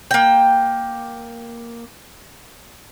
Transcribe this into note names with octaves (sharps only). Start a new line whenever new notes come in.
A#3 G5